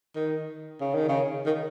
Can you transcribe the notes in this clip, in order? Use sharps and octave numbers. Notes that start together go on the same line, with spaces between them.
D#3
C#3
D#3
C#3
D#3